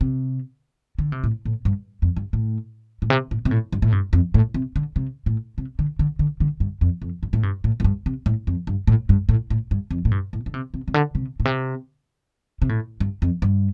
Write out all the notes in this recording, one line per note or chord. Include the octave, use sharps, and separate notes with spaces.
C3
D3
C3
A2
A2
G2
F2
G2
A2
A2
C3
A2
C3
A2
G2
A2
G2
F2
A2
C3
D3
C3
A2
C3
D3
D3
D3
D3
G2
F2
F2
G2
A2
G2
A2
A2
G2
C3
A2
F2
G2
A2
G2
A2
A2
G2
F2
A2
G2
A2
D3
C3
C3
C3
D3
C3
A2
C3
C3
A2
G2
F2
G2